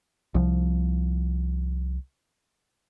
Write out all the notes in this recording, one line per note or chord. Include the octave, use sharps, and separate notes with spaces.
C2 F3